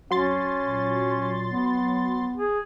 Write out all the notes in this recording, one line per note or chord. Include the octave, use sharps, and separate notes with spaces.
F2 F#3 C#4 C6 A6
A#2
B3
G#4